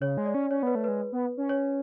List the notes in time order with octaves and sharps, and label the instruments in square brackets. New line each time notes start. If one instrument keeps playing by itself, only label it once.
[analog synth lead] C#3 [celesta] C#5
[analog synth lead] G#3
[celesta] D5
[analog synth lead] C#4
[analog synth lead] C#4 [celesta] C#5
[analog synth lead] B3 [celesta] B4
[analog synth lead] A3
[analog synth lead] G#3 [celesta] B4
[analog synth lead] B3
C#4
[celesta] C#5